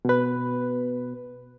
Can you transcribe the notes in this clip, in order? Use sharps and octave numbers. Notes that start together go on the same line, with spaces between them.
B2 B4